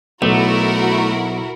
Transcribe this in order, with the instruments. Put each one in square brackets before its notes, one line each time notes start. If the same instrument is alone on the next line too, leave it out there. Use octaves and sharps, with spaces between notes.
[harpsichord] B1 [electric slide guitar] A3 [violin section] E4 F#4 A#4